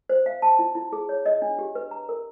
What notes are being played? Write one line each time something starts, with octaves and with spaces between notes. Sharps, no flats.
C5
F5
A5
E4
E4
G#4
C#5
D#5
D4
G4
B4
A#5
A#4